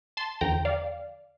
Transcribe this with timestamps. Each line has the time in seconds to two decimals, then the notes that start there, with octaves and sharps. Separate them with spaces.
0.17 A5 C6
0.41 E2 D3 F3 G5 A#5
0.65 D5 F5